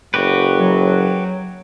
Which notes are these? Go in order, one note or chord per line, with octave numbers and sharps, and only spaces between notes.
F#1 F#4 G4 B4
F#3